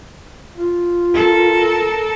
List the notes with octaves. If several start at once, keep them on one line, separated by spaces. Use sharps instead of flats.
F4
A4 A#4